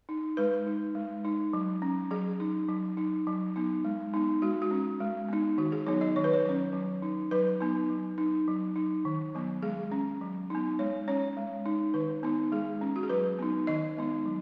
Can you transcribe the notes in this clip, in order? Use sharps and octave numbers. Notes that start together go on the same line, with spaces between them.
D#4
G#3 B4
D#4
G#3
D#4
F#3
C#4
F#3 G#4
D#4
F#3
D#4
F#3
B3 D#4
G#3
B3 D#4
G#3 F#4
F#4
C#4
G#3
B3 D#4
D#3 F#4
G#4
F#3 B3 D#4 C#5
D#5
D#3 C#5
B4
C#5
F#3 C#4
F#3
D#4
F#3 B4
B3 D#4
F#3
D#4
F#3
D#4
D#3
F#3 B3
G#3 G#4
C#4
F#3
B3 D#4
G#3 C#5
C#4 C#5
G#3
D#4
D#3 B4
B3 D#4
G#3 G#4
C#4
F#4
G#4
F#3 B4
B3 D#4
D#3 D#5
G#3 B3 D#4
F#3